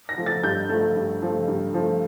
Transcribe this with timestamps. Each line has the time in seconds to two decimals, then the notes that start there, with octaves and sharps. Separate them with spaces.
0.09 A#6
0.18 F3 A3
0.26 A6
0.43 G2 G6
0.70 F3 A3
0.96 G2
1.22 F3 A3
1.48 G2
1.74 F3 A3